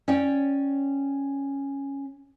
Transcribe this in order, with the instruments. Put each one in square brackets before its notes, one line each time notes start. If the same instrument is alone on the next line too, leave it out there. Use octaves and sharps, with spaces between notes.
[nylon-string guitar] C#4 C#5 D5 G5